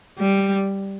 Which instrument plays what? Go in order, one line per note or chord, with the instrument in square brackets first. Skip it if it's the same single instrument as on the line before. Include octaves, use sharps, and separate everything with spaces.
[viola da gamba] G3